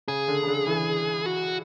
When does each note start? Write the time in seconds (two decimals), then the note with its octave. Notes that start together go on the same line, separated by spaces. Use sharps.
0.08 C#3 G#4
0.28 D3
0.43 C#3
0.47 D3
0.67 E3
1.26 F#4